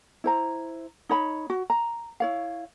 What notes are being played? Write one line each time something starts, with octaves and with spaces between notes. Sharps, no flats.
E4 C5 A#5
D#4 C#5 B5
F#4
A#5
E4 C#5 F5